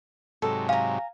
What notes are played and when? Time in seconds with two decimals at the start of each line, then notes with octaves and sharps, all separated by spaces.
0.42 G#2 C3 F#3 A4
0.69 F5 G#5 A#5